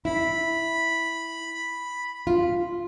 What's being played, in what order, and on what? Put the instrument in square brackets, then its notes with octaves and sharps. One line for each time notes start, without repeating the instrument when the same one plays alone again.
[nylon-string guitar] E4 [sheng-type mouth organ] B5
[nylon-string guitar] F4